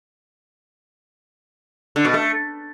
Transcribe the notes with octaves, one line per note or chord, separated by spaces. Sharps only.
D3
B2
A3